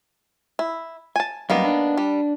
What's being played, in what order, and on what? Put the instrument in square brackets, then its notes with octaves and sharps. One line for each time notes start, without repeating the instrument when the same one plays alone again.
[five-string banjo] E4
G#5 A5
[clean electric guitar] F#2 G3 [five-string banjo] D#3 A#3 B3
[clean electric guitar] D4
[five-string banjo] G3